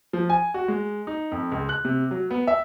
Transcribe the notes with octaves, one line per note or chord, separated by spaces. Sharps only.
F3
G#5
F#4
G#3
D#4
F2
C#2
F#6
C3
F#3
B3
E5